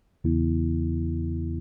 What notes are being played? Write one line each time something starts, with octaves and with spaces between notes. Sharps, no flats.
E2 C#3 E3 B3 E4